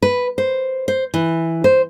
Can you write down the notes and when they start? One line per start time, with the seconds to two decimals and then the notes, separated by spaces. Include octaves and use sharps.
0.03 B4
0.38 C5
0.88 C5
1.14 E3
1.64 C5